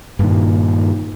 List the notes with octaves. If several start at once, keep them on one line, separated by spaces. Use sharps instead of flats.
G2 A#2 D#3